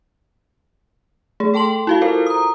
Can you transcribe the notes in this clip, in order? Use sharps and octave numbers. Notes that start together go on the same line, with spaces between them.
A3 G#4
A4 G5 A5 C6 F#7
E4 F#4 F5
E4 F4 A4 A#4 C5 F5
A#5 D#6